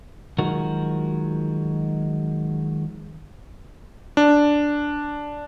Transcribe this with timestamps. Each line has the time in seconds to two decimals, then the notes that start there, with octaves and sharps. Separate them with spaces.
0.38 D#3 F3 F#3 G#3 F#4 A#4
4.17 D4